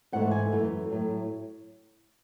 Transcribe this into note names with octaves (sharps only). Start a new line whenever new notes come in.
G#2 E3 A3 F#5
G#5
F#2 E3 A3
A2 F#3 A3